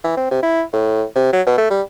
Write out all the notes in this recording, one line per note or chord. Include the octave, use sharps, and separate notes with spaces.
E3
C4
C3
E4
A2
C3
F#3
B2
A3
G3